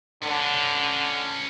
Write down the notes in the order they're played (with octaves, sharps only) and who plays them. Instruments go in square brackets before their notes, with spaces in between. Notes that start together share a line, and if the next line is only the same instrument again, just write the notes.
[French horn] D3 [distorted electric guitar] C#4 B4